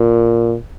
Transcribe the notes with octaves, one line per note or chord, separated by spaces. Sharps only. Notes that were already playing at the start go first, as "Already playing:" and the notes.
Already playing: A#2